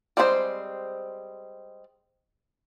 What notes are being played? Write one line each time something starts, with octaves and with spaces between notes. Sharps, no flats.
G3 G#3 C4 F#4 C5